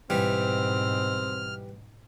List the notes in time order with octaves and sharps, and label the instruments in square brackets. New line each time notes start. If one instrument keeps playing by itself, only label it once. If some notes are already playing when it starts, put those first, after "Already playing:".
[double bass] G#2 B2 [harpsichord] E3 G3 [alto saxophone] C4 [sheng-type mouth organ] F6